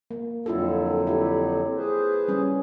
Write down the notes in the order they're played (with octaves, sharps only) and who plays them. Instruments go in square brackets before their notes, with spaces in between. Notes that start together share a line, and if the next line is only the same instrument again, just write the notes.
[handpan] A#3
[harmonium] F2 D3 F#3 [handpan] E4 F4 A4
[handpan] E4 G4
[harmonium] G#4 B4 C5
[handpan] G3 C#4